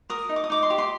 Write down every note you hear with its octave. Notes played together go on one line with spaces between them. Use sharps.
A#4 D#6
D#4
D6
D#6
D#4 D6
C6
G4 D6
C6